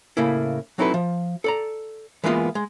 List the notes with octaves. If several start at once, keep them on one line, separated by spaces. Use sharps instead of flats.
A2 C#3 A#3 E4
F#3 C4 D#4 E4 A4 B4
F3
A4 D5 A#5
E3 G#3 A#3 B3 F4 D#5
G#3